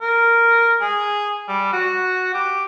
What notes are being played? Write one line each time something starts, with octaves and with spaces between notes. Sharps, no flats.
A#4
G#4
G3
F#4
G4